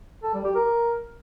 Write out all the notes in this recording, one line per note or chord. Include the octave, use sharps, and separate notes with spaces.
A4
G3
G4
A#4